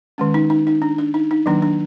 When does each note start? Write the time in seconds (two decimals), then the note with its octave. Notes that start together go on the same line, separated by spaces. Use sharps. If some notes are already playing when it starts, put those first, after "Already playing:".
0.18 D#3 G#3 C#4
0.34 D#4
0.50 D#4
0.67 D#4
0.82 D4
0.98 D4
1.14 D#4
1.31 D#4
1.46 D#3 F#3 A#3 D4
1.62 D4